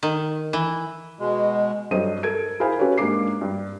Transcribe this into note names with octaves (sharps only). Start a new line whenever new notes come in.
D#3
E3
B2 G#3
G2 F#3 A4 C5 D#5 D#7
A4 A#4 G#6 D7
E4 G#4 A#4 C5 F5 G#5
C#4 F#4 G4 A4 B4 C#5
G#2 A#3 D4 D#4 D6 C7
G2